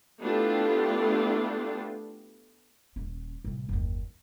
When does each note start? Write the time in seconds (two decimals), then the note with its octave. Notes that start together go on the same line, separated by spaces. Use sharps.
0.21 A3 B3 D4 E4 F4 G4
2.96 D#1 C#4
3.45 C2 A2
3.69 F#1 D#2